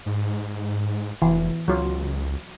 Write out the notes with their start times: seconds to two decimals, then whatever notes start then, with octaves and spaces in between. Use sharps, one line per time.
0.06 G#2
1.22 F1 E3
1.68 C#2 F#3 F4